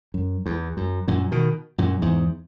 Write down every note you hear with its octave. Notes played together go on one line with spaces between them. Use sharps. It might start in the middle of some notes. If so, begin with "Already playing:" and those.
F#2
E2
F#2
F#2 A#2
B2 D#3
F#2 A#2
E2 G#2